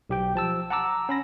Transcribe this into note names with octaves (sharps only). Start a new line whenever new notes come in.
B1 G4 G5
F3 A5 E6
F#5 A5 A#5 D6 E6
C#4 B5 A#6